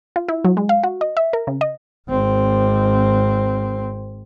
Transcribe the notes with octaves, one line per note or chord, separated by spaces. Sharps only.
F4
E4
F#3
G#3
F5
F#4
D#5
E5
A#4
C#3
D#5
G#1 C4